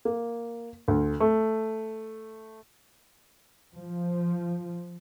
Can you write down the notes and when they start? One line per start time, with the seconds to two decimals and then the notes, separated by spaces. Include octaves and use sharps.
0.05 A#3
0.88 D2
1.20 A3
3.74 F3